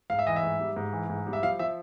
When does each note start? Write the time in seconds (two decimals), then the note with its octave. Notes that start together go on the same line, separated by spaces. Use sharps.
0.10 G#2 F5
0.19 E5
0.26 E3 D#5
0.36 E5
0.43 G#2
0.59 G3
0.76 G#2
0.92 E3
1.10 G#2
1.27 G3
1.33 E5
1.43 F3 F5
1.59 F3 E5